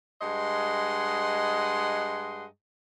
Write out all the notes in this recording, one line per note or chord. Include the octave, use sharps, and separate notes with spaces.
G2 G#3 D#5 F#5 C6